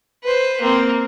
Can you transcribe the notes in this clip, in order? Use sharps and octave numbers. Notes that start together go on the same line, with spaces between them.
B4 C5
A#3 C4